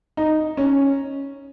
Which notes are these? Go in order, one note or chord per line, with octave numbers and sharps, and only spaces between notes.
D#4
C#4